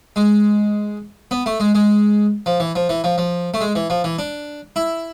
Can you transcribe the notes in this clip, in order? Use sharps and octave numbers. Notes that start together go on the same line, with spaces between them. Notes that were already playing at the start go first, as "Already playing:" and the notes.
G#3
B3
A3
G#3
G#3
F3
E3
F3
E3
F3
F3
A3
G#3
E3
F3
E3
D4
E4